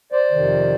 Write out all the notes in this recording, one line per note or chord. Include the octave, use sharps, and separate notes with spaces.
C5 D5
F2 C3 D#3